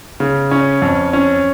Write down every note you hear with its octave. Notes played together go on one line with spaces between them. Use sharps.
C#3
C#4
F2
C#4